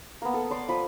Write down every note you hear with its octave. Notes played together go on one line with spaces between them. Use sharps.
A#3 B3
A4
D5 C6 D6
F3 B5 D#6